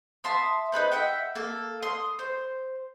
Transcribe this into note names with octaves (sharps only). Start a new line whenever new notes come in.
E5 A5 C6 D#6
D#4 G#4 B4 C5
E5 F#5 G5
A#3 A4
C6 D#6
C5